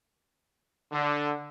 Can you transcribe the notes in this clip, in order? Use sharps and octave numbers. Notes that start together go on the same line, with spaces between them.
D3